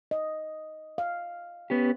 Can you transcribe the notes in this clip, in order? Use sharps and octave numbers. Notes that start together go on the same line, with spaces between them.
D#5
F5
B3 C#4 G4